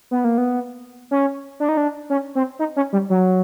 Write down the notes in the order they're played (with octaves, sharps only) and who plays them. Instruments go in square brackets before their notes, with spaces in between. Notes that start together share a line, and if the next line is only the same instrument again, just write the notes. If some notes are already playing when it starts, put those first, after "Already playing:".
[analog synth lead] B3
A#3
B3
C#4
D4
D#4
D4
C#4
C4
D#4
C#4
G3
F#3